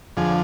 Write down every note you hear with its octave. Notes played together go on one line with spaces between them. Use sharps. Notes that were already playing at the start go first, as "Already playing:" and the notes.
F2 D3 F3 G#4